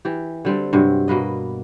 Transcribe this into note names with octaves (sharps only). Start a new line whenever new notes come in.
E3 G4
D3 G3 C4
G2 C3 F#3
B2 A#3 B4 D#5